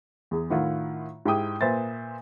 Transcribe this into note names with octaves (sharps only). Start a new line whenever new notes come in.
E2 G#4
A2 D#3 E4 F4 F#5
G#2 E4 G4 G5 D#6
A#2 B4 C5 E5 A6